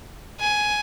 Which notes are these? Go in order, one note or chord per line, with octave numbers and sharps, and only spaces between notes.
G#5